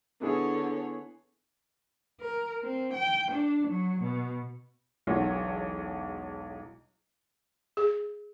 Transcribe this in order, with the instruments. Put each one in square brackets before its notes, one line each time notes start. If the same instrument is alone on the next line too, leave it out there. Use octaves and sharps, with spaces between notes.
[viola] D3 C#5 [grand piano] B3 E4 G#4
[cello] A#4
C4
G5
D4
F#3
B2
[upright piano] E1 B1 E2 E3 F#3 C#5
[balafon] G#4